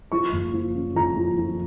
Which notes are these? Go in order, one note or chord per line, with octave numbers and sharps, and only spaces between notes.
F3 C#6
F#1
F3
C#3
F2 A#5
F3
F3